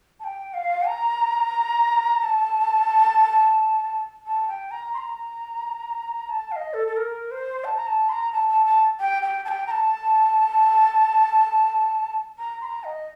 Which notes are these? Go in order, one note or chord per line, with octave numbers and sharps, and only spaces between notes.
A5
G5
F5
A#5
A5
A5
G5
A#5
C6
A#5
A5
F5
D#5
A4
A4
A#4
C5
A5
A#5
A5
C6
A#5
A5
A5
A5
G5
G5
A5
G5
A#5
A5
A#5
C6
A#5
D#5